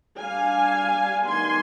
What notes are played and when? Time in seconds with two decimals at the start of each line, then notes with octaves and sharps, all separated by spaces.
0.20 G3 D4 F5 G#5
1.26 D#3 G3 B3 D4 G#5 C6